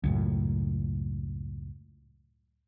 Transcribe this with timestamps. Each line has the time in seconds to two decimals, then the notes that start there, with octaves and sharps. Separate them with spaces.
0.04 C#2 F#2 A2